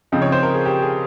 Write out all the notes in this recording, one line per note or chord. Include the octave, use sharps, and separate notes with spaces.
C#3 F3 C4 D#4
C#5
C5
A#4
G#4
G4
G#4